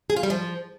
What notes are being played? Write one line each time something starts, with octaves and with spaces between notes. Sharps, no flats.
G#4
F4
G3
F3